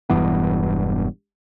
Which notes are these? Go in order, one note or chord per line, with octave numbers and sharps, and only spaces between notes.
E1 G2 E3 B3